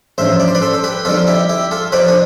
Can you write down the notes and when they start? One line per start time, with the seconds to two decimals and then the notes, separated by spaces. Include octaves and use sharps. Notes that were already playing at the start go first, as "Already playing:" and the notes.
0.18 A1 G2 F3 C5 E5
0.40 D5
0.48 C5
0.55 B4 D5
0.62 A4 C5
0.73 A4
0.84 G4 B4
1.05 F2 D3 G3 F4 A4
1.27 E4 G4
1.49 E4 G4
1.71 F4 A4
1.92 F2 C3 F3 B4 D5
2.08 D4